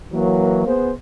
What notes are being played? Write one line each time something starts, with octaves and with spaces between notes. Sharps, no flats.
E3 F#3 A#3
B3 G#4 C5